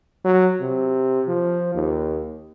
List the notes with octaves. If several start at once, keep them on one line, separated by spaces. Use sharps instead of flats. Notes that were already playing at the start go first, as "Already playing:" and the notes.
F#3
C3
F3
D#2